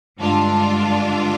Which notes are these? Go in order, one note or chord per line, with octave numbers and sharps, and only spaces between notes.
G2 D3 G#3 D4 F4